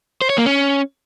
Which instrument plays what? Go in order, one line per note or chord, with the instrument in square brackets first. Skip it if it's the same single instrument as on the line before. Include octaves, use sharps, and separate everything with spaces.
[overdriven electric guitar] C5
C#5
A#3
C#4